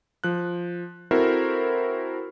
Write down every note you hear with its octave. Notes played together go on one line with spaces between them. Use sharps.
F3 F#6
C4 E4 F#4 A4 A#4 C5